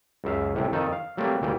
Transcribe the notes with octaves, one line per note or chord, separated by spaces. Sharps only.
C#2 F#2 E5 F5
C2 A2 C3
F2 D#3 D#4 A4
F5
F#3 G3 A3 A#3 C4
D2 A#2 E3 G3 G5